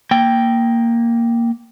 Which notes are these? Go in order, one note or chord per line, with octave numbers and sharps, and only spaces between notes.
A#3 G5